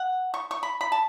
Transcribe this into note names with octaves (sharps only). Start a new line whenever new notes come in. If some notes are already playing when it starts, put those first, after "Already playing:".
Already playing: F#5
C#6
C#6
B5
B5
A5